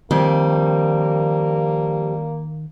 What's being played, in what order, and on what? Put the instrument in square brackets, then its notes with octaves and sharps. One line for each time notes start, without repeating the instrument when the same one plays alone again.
[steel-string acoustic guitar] F2 G3 [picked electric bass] D#3 [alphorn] A#3